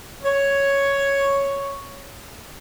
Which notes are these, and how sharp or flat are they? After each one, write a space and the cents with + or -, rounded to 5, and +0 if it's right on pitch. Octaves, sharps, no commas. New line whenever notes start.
C#5 +0